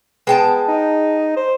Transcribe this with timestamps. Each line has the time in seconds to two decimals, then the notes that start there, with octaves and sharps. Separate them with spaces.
0.27 G#3 B3 G5 A5
0.68 D#4
1.36 C5